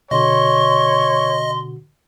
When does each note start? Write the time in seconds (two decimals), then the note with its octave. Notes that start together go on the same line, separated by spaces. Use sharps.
0.11 B2 D3 F#4 C#5 D#5 C6